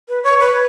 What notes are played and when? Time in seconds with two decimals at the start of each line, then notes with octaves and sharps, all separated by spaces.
0.09 B4
0.24 C#5
0.40 B4